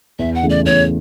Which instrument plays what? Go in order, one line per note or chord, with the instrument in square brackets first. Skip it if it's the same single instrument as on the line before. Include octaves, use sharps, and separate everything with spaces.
[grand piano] E2 [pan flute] E5
[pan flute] F#5
[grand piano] C#3 E3 A3
[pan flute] D5
[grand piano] E2 [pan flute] C#5